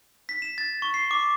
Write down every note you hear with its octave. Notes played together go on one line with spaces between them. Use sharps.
B6
E7
A6
C#6
C7
D6